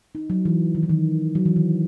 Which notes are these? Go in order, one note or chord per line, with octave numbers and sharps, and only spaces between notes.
D#4
F#3
E3
D#3
E3
D#3
F#3
E3
D#3